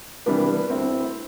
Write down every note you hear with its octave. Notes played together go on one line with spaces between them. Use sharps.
C3 E3 G3 B3 D4
D2 C4 E4